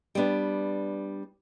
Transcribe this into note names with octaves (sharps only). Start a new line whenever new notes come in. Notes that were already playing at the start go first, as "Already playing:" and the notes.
G3 B3 D4